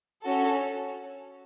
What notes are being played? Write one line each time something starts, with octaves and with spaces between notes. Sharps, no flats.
C#4 F#4 A4